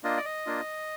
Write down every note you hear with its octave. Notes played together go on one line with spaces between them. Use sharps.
A#3 D4 F4 D#5
D5
D#5
A#3 D4 F4